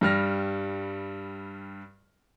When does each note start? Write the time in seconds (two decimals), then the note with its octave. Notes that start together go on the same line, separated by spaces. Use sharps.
0.01 G2 G3 F6 A#6